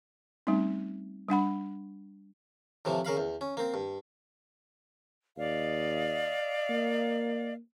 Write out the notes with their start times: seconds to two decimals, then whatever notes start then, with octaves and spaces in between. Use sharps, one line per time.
0.47 G3 A3 C4 C#4 D#4
1.29 G3 D4 F#5 B5
2.85 A2 C3 E3 F3
3.05 C#3 A#4 F5 B5
3.17 E2
3.41 C#4
3.57 A#3 C4
3.74 G2
5.38 D#2 D5 D#5 F5
6.69 A#3